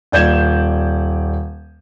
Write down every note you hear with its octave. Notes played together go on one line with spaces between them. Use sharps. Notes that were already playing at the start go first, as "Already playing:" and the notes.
D#1 D5 G6 G#6 E7